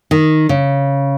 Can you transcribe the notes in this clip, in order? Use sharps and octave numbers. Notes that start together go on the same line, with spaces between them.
D#3
C#3